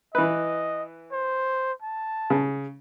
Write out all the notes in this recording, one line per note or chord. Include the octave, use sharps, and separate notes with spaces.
E3 B4 D#5
C5
A5
C#3